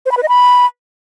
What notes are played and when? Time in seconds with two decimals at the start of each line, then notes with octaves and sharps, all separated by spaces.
0.06 C5
0.11 B5
0.17 B4
0.23 D#5
0.29 B5